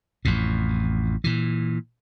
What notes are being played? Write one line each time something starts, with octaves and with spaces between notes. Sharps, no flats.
A1 F2 A2
A#2 E3